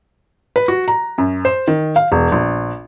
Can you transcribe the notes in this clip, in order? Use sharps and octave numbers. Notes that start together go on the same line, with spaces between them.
B4
F#4
A#5
F#2
C5
D#3
F5
E1
A#1